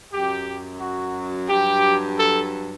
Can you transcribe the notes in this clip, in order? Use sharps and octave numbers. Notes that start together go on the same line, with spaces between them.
F#2 F#3 G4
F#4
G2 F#3 G4
A4